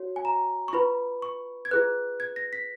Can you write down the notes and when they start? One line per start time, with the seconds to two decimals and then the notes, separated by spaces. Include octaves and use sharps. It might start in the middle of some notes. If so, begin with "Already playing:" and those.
Already playing: F#4 C#5
0.16 G#5
0.25 A#5
0.68 C#6
0.73 F4 B4 B5
1.22 C#6
1.65 G#6
1.71 F4 G#4 B4 F#6
2.20 G#6
2.36 A#6
2.53 B6